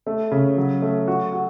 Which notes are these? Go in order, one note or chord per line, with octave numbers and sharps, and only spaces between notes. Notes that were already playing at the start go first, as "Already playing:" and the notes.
A3
C#3
F#3
A3
F#4
F#4